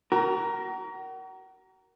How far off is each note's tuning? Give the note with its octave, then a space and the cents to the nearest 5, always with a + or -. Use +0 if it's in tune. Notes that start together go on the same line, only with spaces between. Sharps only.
F#4 +35 A#4 +0